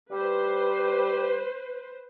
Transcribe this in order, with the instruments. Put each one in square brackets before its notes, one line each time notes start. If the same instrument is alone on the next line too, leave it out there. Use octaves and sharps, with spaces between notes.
[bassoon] G3 [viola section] B4 C5